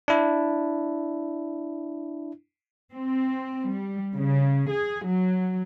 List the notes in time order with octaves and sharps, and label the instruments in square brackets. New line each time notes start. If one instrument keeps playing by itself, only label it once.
[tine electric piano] D4 E4
[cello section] C4
G3
C#3
G#4
F#3